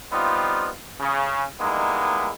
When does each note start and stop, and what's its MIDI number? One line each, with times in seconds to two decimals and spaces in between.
0.12 0.69 55
0.12 0.69 59
0.12 0.69 60
0.12 0.69 63
0.12 0.69 65
1.00 1.44 49
1.60 2.29 55
1.60 2.29 56
1.60 2.29 58
1.60 2.29 59
1.60 2.29 63
1.60 2.29 64